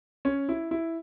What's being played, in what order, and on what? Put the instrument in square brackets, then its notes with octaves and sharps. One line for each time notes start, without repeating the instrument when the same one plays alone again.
[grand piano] C#4
E4
E4